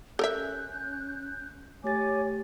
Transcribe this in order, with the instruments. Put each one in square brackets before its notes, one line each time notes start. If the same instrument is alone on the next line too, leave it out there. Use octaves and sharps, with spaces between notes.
[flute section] C#4 F#6 G6 [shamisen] A4 A#4 E5
[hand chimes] A3 G4 A6 [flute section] C#5 G#5 D6